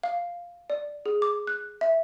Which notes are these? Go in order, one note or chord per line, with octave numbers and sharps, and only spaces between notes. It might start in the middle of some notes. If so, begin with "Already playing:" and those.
F5
D5
G#4
D6
F#6
E5